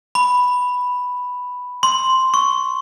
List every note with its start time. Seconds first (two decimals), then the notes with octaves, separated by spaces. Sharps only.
0.15 B5
1.83 C6
2.34 C#6